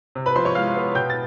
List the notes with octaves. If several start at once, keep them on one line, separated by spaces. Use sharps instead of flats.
C3
B4 B5
F3 C5 C6
C#5 C#6
G#3 F5 F6
B3
B2 G5 G6
A6